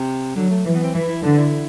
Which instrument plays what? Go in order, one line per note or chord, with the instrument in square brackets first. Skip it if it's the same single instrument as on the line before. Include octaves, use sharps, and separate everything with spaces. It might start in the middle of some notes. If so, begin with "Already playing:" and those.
Already playing: [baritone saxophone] C3
[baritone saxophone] D3 [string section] F#3
[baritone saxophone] A3
[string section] E3
[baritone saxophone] B3
C4
[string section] E3 [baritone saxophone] E4
[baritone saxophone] E4
[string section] D3 [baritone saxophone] D4
[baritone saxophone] E4